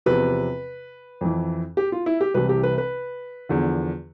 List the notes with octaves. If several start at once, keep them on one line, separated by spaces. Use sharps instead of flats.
E2 C3 F3 B4
F2 E3
G4
F4
E4
G4
C2 C3 E3 B4
G4
B4
B4
E2 D3 F3